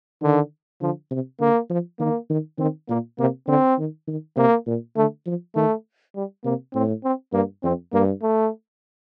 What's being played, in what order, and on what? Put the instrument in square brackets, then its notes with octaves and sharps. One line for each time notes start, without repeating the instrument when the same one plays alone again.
[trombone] D3 [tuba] D#3
[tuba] D3 [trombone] F3
[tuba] C3
[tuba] D3 [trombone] A#3
[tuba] F3
[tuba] D#3 [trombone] A#3
[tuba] D#3
[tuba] D#3 [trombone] C4
[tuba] A#2 [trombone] A#3
[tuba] C3 [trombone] A#3
[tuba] D3 [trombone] C4
[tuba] D#3
D#3
[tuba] C3 [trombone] A#3
[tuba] A#2
[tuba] D3 [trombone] A3
[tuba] F3
[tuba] D#3 [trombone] A3
[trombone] G3
[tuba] C3 [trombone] A#3
[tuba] A2 [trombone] C4
[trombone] C4
[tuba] G2 [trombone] A#3
[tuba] F2 [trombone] C4
[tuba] G2 [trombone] A#3
[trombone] A3